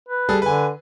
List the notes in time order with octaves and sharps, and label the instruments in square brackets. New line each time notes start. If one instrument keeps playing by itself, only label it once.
[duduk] B4
[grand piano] G3 G#4 A4
[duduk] D3 [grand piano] B4 G#5